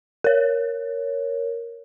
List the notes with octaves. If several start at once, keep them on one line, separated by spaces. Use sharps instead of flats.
A#4 C#5